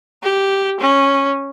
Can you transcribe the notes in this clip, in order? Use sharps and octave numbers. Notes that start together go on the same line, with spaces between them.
G4
C#4